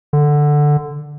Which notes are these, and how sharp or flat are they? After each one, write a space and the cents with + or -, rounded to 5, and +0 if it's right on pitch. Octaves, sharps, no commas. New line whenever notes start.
D3 +5